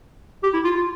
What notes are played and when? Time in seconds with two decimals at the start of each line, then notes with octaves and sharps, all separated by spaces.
0.43 G4
0.54 E4
0.64 F4
0.75 F4